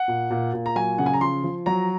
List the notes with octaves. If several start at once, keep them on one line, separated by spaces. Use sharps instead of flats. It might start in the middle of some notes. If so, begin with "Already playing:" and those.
Already playing: F#5
A#2
A#2
A#2
A#5
F#3 G#5
C#3 F#5
G#5
A#5
F3 C6
F3
F#3 A#5